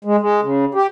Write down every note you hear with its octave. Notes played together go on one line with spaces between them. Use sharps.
G#3
G#3
C#3
G4